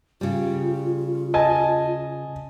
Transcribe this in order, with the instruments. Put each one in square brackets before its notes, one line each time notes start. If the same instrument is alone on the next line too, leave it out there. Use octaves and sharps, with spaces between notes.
[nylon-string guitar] C#3 G3 [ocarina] F4
[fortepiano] D#5 G#5 A5